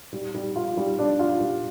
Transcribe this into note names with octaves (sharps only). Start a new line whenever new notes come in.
G3
G3
F4
G3
D4
F4
G3